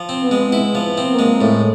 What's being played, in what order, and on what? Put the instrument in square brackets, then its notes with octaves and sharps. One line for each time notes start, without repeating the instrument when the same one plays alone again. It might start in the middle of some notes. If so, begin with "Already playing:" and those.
Already playing: [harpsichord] F3
C4
[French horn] B3
[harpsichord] G#3
E4
F3
[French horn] B3
[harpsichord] C4
[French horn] A#3
[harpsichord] G#3
[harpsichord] A2 [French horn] A3